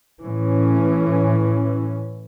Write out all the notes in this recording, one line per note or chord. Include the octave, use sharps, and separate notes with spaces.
A2 E3 C#4